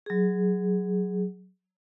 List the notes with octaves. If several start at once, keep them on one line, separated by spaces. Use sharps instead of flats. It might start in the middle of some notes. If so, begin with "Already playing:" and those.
F#3 G#4